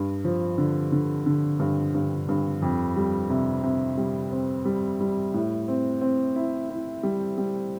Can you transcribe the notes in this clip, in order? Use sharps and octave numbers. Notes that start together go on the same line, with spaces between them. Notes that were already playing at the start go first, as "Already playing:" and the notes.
Already playing: G2
F3
D3
D3
D3
G2
G2
G2
F2
G3
C3
C3
G3
C4
G3
G3
A2
C4
C4
E4
E4
G3
G3